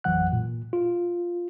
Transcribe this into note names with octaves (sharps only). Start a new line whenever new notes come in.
A1 F2 E3 F#3 F#5 F#6
A#2
F4